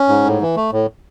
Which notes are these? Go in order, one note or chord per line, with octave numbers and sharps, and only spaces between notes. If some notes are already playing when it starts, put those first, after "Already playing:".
Already playing: C#4
G#2
A2
E3
A3
A2